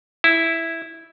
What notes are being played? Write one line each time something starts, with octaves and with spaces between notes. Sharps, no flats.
E4